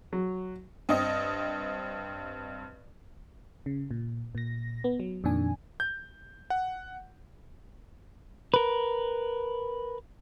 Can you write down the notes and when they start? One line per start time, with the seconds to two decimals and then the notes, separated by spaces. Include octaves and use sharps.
0.13 F#3
0.89 G2 C4 D#5
3.66 C#3
3.91 A#2
4.35 A#2 A#6
4.84 B3
5.00 F#3
5.24 F2 A#2 D#3 D4 G#5
5.80 G6
6.50 F#5
8.54 A#4 B4